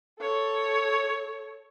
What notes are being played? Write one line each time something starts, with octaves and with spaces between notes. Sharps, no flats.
A4 C#5